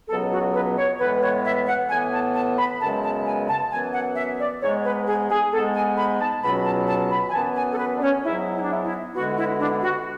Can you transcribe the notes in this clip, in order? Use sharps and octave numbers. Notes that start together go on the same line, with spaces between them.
C#2 B2 F#3 B3 A4
F#4
B4
C#5
A2 E3 G#3 B3 B4
C#5
E5
F#5
A2 E3 B3 G#5
A5
A5
B5
F#2 C#3 G#3 B3 A5
A5
G#5
A5
F#2 E3 B3 G#5
F#5
E5
D5
G#2 G#3 B3 C#5
B4
G#4
G#4
G#2 G#3 B3 A4
G#5
B5
A5
C#2 B2 F#3 B3 B5
A5
A5
B5
G#5
F#2 E3 B3 A5
G#5
A4
B4
D4
C#4
G#2 F#3 B3 E4
E4
D4
E4
E4
D2 D3 G#3 B3 F#4
E4
D4
F#4